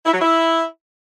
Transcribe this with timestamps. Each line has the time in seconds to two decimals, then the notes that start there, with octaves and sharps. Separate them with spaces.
0.06 E4
0.13 F#3
0.21 E4